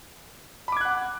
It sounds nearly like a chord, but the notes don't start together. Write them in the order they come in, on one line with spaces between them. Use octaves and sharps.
B5 D6 G#6 F#6 F#5